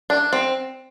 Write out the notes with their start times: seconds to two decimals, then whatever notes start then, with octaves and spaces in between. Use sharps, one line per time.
0.10 D4
0.33 C4